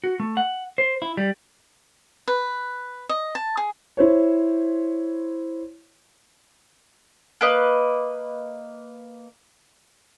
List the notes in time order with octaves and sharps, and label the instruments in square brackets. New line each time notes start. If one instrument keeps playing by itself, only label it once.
[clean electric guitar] F#4
A3
F#5
C5
E4
G3
[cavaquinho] B4
D#5
A5
G#4
[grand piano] E4 C5 C#5
[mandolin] A#3 B4 D#5